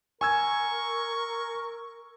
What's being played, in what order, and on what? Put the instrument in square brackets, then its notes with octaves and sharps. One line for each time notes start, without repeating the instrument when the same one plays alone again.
[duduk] A#4 [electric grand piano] G#5 E6 G#6 [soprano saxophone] C#6